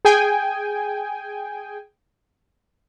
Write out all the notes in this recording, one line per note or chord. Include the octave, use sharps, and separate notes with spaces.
G#4 G5 G#5